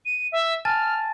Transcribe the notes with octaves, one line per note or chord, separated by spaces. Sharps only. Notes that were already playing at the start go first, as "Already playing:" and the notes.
D#7
E5
G#5 A5 F6 A6